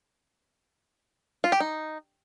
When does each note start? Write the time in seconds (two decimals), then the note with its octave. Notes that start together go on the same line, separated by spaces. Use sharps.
1.44 F4
1.52 G4
1.60 D#4